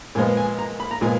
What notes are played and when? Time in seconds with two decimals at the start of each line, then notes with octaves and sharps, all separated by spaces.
0.15 A#2 F3 G#3 B3 G#5
0.37 G#5
0.59 A#5
0.80 B5
0.91 A#5
1.01 A#2 F3 G#3 B3 G#5